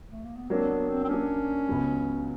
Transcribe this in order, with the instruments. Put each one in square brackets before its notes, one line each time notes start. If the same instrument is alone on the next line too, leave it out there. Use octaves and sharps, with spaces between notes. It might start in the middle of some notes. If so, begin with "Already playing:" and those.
[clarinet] A3
A#3
B3
[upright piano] F#3 A#3 D4 [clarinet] C4
[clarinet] B3
C4
C4
[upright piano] F#3 A#3 D4 [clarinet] C#4
[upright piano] C#2 C#3 F#3 B3